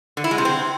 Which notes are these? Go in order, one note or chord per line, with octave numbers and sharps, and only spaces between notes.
D3
E4
G#3
C3
C4